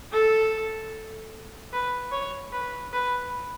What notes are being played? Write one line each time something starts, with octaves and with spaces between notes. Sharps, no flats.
A4
B4
C#5
B4
B4